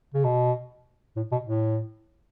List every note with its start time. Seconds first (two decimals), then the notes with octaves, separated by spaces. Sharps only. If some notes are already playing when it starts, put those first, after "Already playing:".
0.14 C#3
0.24 B2
1.16 A2
1.32 B2
1.46 A2